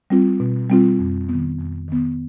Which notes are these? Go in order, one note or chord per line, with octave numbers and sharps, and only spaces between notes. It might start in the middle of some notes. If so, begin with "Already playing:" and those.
G3 C4 F4
B2
G3 C4 F4
F2
D#3 B3
F2
D#3 B3